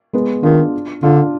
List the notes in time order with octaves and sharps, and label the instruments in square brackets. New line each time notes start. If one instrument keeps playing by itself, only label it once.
[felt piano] G#3 B3
[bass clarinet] D#3 [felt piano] D4 F4
[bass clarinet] D3 [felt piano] D4 F4